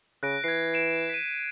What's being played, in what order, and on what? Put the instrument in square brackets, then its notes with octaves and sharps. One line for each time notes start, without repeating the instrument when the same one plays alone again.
[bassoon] C#3 [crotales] F#6 A#6 D7
[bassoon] E3 [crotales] G#6 C7
[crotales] C7 D7 E7
B6 D#7